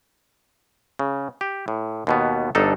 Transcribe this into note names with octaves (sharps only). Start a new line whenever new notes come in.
C#3
G4
A2
D#2 B2 B3
G1 D4 D#4 A4